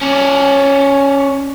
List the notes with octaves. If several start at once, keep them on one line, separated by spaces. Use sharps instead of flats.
C#4 D5